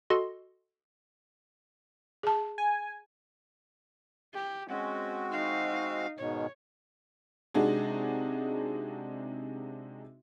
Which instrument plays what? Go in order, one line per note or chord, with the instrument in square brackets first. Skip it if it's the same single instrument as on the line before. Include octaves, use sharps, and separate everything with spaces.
[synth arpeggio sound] F#4 A4 D#5 C6
[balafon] G#4 A5
[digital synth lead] G#5
[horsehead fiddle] G4
[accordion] G#3 C4 F#4 [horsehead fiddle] C#4
[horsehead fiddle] D#4 F5
[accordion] G#2 B2 D#3 [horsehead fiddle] C#5
[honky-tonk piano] C3 G#3 D4 D#4 F#4 G#4